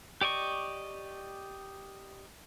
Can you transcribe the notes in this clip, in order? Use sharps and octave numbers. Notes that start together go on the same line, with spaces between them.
G4 D5 D#5 C#6